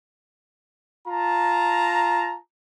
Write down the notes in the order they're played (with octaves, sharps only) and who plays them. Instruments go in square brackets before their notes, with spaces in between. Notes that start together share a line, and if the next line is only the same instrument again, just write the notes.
[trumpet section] F4 A5 A#5